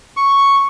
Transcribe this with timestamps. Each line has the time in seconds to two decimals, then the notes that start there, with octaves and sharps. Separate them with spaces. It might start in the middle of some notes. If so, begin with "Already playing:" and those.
0.17 C#6